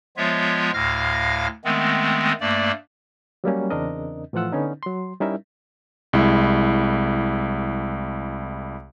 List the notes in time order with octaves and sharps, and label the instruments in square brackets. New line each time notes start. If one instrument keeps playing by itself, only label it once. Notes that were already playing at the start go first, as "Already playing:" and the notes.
[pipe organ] F3 G#3 B3 F4 C#5 E5
D2 A2 F5 F6 A#6
D#3 G#3 A3 B3 C4
G2 A3 A#3 D5
[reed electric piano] F#3 G3 A#3 C#4
E2 C#3 C4 D4 A#4 D#5
A2 E3 F3 F4 F#5 E6
D3 B3 C#4 D#4
F#3 C6
G3 C#4 D#4 E4 A#4 E5
[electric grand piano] C2 G#3 E4